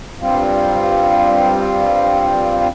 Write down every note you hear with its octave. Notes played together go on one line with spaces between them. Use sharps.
G2 G3 C4 F4